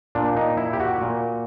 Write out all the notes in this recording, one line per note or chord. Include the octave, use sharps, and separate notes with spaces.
A#2 D4
D#4
E4
G4
F#4
A#2